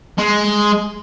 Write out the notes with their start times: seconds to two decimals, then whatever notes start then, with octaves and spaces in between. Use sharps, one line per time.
0.18 G#3